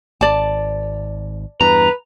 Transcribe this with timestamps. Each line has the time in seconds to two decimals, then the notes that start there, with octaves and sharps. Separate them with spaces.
0.21 G#1 D5 A5
1.61 E2 G2 B4 A#5